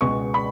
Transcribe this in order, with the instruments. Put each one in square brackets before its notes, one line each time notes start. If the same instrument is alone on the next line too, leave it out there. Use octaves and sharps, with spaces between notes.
[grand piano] C#2 B2 G#3 B3 C#6
B5